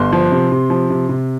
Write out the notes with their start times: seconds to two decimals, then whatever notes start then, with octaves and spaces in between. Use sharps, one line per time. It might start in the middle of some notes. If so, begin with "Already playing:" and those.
Already playing: G1 C6
0.13 F3
0.32 C3
0.52 C3
0.70 F3
0.90 C3
1.09 C3